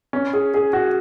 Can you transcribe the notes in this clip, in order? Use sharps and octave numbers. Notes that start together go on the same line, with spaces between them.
C#4
G#4
G#4
F#4